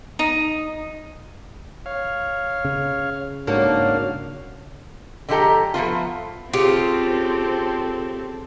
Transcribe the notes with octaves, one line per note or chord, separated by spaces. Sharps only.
D#4
C#5 F5
C#3
G#2 A#3 D4 F#4 A4 C#5 F5
D3 F3 G#3 G4 A4 A#5
F3 A3 B3 F4
C#3 C4 F4 G4 A4